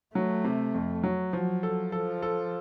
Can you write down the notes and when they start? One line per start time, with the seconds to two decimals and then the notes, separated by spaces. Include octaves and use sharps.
0.15 F#3 A3
0.44 C3
0.74 F2
1.03 F#3
1.33 F3 F#3
1.63 A4
1.92 F3 A4
2.22 A4